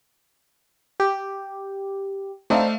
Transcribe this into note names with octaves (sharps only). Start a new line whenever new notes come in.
G4
A3 C4 D4 D#4 E5 F5